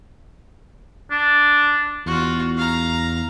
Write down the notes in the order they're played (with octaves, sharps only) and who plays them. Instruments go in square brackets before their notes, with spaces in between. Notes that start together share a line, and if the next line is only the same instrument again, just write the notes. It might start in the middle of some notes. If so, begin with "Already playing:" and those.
[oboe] D4
[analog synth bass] E2 [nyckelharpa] F4 F#4
[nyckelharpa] F5 A#5